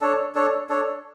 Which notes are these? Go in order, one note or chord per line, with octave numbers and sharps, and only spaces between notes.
D4 A4 C#5
D4 A4 C#5
D4 A4 C#5